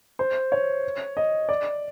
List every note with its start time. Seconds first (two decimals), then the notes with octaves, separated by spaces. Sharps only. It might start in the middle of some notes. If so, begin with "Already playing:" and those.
0.19 C5
0.52 C#5
1.17 D#5
1.49 D5